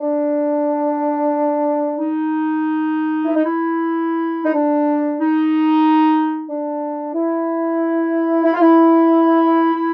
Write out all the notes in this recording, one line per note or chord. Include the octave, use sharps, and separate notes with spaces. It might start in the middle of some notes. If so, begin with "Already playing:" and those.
D4
D#4
E4
D#4
E4
D#4
D4
D#4
D4
E4
E4
F4
E4
E4